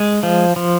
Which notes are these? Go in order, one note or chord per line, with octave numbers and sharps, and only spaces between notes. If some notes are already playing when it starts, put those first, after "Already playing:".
Already playing: G#3
F3
F3